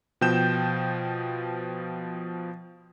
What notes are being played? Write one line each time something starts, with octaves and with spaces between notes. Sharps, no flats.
B2 F3 G5 G6 E7